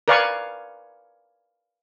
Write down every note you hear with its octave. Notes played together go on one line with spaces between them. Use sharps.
A#4 B4 D5 F5 G#5 C#6